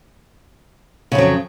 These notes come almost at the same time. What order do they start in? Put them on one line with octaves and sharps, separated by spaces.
C#3 F2 F#3